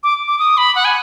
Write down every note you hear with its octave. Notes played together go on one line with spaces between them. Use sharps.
D6
D6
D#6
B5
F#5
G#5